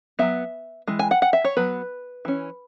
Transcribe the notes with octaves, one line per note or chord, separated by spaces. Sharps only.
F#3 B3 E5
E3 G#3
G#5
F#5
F#5
E5
C#5
F#3 B3 B4
E3 C#4